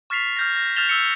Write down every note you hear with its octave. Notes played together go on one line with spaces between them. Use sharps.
C#6 F6 A6 B6 C7 F7
F6 G6 A#6
A#6 C7
F6 G6 A6 E7 F7 G7
E6 C#7 F7